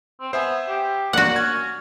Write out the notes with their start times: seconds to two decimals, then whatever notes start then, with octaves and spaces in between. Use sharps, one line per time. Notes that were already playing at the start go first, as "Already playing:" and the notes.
0.20 C4
0.33 B3 C5 E5 G#5
0.69 G4
1.13 A#3 F#4 D5 F#5
1.36 C#4 G#6